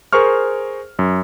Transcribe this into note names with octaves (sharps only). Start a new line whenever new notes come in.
G#4 A#4 C5 C#6 F6
F#2